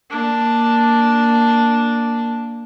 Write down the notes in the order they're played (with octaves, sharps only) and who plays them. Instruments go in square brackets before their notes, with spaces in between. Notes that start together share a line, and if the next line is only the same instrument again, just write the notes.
[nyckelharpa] A#3 D4